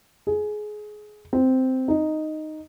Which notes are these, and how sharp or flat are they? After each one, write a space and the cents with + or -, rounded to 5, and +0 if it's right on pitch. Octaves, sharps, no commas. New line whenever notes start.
G#4 +20
C4 -10
D#4 -5